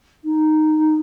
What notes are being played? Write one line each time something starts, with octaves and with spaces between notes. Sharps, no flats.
D#4